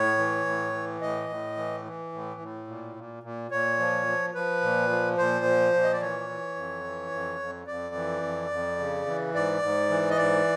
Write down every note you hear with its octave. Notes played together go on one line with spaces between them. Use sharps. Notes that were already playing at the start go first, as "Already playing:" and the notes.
Already playing: A2 C#5
E3
A2
E3
A2 D#5
A2
E3
E3
A2
A2
A#2
A#2
A#2
A#2 C#5
F3
F3
F3 B4
A#2
F3
A#2 C5
F3
A#2
D#5
D5
E3 C#5
E3
F2
E3
F2
F2
F2 D5
E3
F2
F2
C#3
E3
G#2 D5
G#2
E3
D#5
G#2 D5